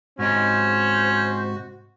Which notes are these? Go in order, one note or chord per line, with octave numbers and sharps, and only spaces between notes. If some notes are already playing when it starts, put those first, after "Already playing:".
G#2 C3 C#4 F#4 C5 D#5